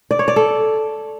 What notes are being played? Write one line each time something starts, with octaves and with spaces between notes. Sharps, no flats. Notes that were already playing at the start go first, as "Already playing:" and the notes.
D5
C#5
D5
A4